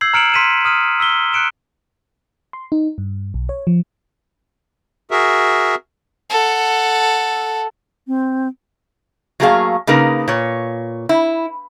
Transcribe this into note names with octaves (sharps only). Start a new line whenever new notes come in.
E6 G6 G#6 C7 F#7
A#5 F6 C#7 D7 E7 F#7
C6 B6 C7 D#7 E7
D#6 F6 D#7
E6 B6 G7
F#6 C#7 D7 E7
C6
D#4
G2
B1
C#5
F3
F#4 G#4 A#4 E5
A4 F#5
C4
F#3 A3 A#3 G#4 A4 F5
C#3 A#3 D#4 A#4 B4
A#2 C#5
E4